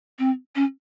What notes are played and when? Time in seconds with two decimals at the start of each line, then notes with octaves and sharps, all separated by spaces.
0.19 C4
0.55 C#4